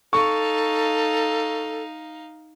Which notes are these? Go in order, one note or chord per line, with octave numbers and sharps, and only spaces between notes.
D#4 A4 F5 C#6